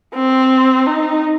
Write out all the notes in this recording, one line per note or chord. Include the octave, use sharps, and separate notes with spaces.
C4
D#4